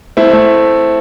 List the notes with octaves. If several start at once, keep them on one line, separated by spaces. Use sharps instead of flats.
A3 C4 E4
A3